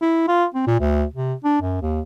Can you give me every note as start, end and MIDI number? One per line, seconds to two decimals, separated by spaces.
0.01 0.23 64
0.28 0.45 65
0.54 0.66 60
0.67 0.78 46
0.80 1.04 38
1.14 1.34 48
1.44 1.59 62
1.61 1.80 42
1.82 2.01 39